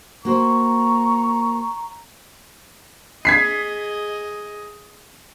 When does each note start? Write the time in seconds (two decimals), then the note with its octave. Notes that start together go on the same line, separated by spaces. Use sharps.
0.25 A#3 F#4 C5 A#5 C#6
3.25 G#4 D#5 G#6 B6 C7